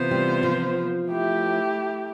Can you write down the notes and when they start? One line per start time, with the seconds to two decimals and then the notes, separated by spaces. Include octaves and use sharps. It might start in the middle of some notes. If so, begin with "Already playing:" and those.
Already playing: C3 E3 B3 F4 C5
0.11 G3
0.43 F3
1.08 A3 E4 G4